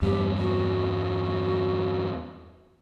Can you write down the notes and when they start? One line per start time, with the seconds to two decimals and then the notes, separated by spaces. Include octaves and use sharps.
0.02 E2 G2 G3 G4
0.38 F#4